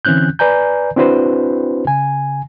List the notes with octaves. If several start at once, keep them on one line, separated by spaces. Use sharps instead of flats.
D3 E3 C4 C#4 F#6 G6
B4 D5 G#5 A#5 G6
C4 D4 E4 F#4 B4 C5
C#3 G#5